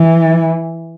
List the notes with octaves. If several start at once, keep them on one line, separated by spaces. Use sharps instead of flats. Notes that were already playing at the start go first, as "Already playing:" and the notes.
Already playing: E3